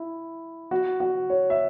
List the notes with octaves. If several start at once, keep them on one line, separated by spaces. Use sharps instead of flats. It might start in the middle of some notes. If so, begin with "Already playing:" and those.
Already playing: E4
F#4
F#4
C#5
E5